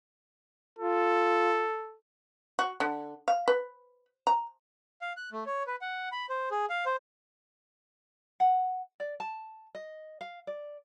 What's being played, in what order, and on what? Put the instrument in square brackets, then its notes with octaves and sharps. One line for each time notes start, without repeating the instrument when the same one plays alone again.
[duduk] F4 [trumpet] A4
[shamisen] F#4
D3
F5
B4
A#5
[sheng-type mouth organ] F5
F#6
A3
C#5
B4
F#5
B5
C5
G#4
F5
C5
[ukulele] F#5
D5
A5
D#5
F5
D5